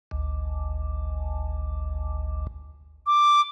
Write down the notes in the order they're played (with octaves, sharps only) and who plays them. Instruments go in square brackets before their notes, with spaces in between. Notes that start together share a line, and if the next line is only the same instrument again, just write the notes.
[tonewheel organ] G#1 D2
[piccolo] D6